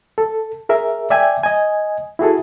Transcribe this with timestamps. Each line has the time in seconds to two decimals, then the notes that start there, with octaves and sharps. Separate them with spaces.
0.18 A4
0.69 G#4 A#4 E5
1.10 D5 E5 G5 G#5
1.44 D#5 G#5
2.19 E4 F#4 G#4 A4